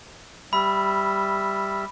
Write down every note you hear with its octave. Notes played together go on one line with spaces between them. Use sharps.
G3 E5 B5